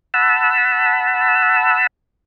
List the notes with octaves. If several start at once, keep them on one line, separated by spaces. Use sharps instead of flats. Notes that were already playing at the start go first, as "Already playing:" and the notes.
F#5 A5 B5 E6